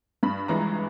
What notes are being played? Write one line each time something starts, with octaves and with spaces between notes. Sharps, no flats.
G2 B5
E3 G#3 A#5